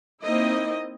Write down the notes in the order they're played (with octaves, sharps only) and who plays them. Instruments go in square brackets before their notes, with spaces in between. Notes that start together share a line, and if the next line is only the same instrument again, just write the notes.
[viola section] A#3 C4 D#4 E4 D#5